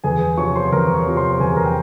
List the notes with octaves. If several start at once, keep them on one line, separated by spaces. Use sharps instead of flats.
E2 G#4 G#5
C3 F3 C#5 C#6
C5 C6
E2 A#4 A#5
C#5 C#6
C3 F3
C5 C6
E2 G#4 G#5
A#4 A#5
G5